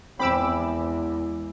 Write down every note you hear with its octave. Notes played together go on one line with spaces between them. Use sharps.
E2 E3 G#3 C4 G5 B5 D6 E6